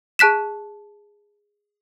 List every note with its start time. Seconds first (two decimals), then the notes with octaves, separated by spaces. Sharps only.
0.19 G#4 A5 F#6 B6 E7